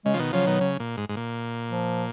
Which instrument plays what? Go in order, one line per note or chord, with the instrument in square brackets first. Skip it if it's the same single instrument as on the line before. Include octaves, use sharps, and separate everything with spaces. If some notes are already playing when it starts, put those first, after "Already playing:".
[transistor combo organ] C#3 [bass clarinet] G#3
[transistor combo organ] F3
B2 D#3
[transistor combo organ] C#3 F3 [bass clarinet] F#3
[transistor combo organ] B2 D#3
C#3
A#2
G#2
G#2
A#2
[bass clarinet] F3